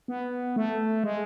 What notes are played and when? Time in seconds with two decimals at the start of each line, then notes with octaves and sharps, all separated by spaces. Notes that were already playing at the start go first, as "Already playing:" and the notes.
0.08 B3
0.56 A3
1.04 G#3